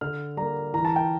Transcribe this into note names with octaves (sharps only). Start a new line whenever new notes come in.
D3 F6
G3 A#3 A#5
E3 A#5
A5
G5